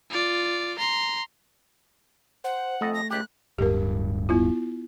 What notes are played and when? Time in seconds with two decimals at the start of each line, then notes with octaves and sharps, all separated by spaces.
0.10 F4 D5
0.79 A#5 C6
2.44 C5 F#5
2.81 F2 A3 A4 D#5
2.94 A#6
3.10 C#2 G4 F#6
3.58 D1 G2 G4 A#4
4.29 B3 E4 F4